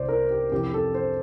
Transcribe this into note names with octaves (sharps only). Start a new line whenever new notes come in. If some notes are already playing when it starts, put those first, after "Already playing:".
Already playing: C2 C3 C5 D5
A#4
G4
F2 C3 E3 G4
A4
C5